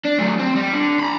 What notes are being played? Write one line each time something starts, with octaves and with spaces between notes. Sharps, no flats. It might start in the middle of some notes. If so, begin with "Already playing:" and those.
D4
F#3 A3
C4
G3
D3
A#5 B5